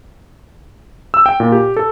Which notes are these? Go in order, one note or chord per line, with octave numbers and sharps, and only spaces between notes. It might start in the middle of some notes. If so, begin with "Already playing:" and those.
E6
G5
A#2
G4
A4